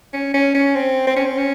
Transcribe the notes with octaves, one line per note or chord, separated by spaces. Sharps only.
C#4
C#4
C#4
C4
C4
C#4
C4
C#4